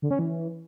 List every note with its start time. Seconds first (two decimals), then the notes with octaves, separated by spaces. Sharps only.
0.02 D3
0.11 C#4
0.19 E3